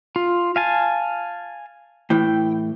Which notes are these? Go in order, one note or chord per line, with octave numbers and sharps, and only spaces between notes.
F4
F5 G#5 A5
A2 E3 G5